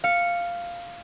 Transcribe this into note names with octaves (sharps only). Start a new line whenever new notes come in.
F5 C#7